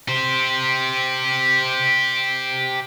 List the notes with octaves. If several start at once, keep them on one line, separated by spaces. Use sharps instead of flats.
G4 C5